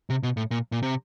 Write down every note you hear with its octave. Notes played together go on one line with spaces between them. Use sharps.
C3
B2
A2
A#2
A#2
C3